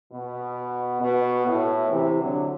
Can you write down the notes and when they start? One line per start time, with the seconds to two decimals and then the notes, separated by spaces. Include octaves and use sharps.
0.13 B2
1.02 B2
1.47 A2
1.91 C3 E3
2.20 D3 F#3